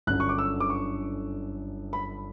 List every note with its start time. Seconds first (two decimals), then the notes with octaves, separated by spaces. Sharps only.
0.07 G1 F#2 D3 F#6
0.20 C#6
0.29 D6
0.38 E6
0.60 D6
0.70 C#6
1.93 B5